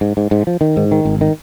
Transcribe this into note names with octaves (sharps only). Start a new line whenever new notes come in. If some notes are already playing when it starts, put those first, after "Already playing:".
G#2
G#2
G#2
F3
D#3
G#2
D#3
G#1
D#3